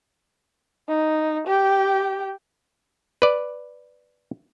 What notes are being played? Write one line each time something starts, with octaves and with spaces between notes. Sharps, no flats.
D#4
G4 G5
B4 D5